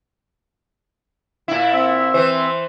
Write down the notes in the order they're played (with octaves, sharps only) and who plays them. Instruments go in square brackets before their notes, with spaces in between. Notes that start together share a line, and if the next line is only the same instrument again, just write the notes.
[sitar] A#2 E4
[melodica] C4 E5
[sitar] E3 C5